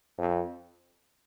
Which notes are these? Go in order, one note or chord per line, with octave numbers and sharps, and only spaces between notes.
F2